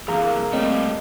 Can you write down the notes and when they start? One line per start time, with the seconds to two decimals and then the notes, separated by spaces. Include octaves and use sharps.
0.08 C2 E3 A#3 G#4
0.53 G3 A3 C4 C#5 D#5 G5